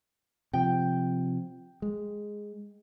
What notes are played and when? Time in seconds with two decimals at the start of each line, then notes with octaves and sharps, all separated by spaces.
0.53 C3 F3 G5
1.82 G#3